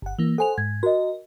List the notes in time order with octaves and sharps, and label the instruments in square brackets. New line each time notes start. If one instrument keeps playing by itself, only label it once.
[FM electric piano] G1 F#5
E3 A#3
[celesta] A4 G#5 F7 [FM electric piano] C5 F#5
[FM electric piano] G#2 [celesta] G#6
[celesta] F#4 D#5 [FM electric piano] A#4